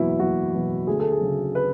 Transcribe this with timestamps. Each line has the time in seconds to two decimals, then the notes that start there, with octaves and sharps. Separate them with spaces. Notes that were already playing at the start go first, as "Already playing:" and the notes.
Already playing: F#1 E2 B2 F#3 E4
0.20 F#1 F#4
0.53 E2 B2 F#3
0.87 D2 G#4
1.00 A4
1.12 G#4
1.21 C#3 F#3
1.55 B4